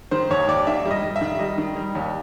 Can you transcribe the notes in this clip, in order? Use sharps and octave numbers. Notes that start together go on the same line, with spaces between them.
D#3 C5
D#2 C#5
D#2 D5
D#3 E5
G3
D#5
G3
E5
D#3
G3 D#5
D#3
G3
D#2